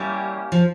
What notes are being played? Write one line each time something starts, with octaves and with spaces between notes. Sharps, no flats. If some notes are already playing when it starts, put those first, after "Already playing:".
Already playing: G3 A#3 C#4 E4 G4
F3